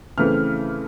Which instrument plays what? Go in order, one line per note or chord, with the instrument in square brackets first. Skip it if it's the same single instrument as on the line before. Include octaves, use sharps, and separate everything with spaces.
[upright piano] C#3 E3 A3 C4 E4 F6